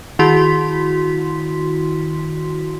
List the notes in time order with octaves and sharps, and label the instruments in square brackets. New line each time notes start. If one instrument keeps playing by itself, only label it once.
[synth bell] D#3 E4 F#4 C6 B6